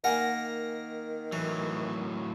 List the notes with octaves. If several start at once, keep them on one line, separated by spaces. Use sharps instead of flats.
D#3 A#3 A#4 F#5 G#5
A2 E3 F#3